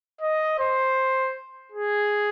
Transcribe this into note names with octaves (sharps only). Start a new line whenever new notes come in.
D#5
C5
G#4